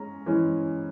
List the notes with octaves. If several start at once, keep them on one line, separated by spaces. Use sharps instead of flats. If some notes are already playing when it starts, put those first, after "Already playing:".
Already playing: G#3 C#4 A#5
E3 G#3 C#4